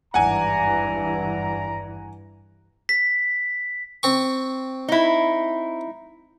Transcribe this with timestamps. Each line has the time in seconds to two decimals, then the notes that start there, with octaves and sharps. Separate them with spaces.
0.14 G#1 E2 G2 E3 D5 F#5 G#5 A#5
2.89 B6
4.03 C4 C#6
4.88 D#4 E4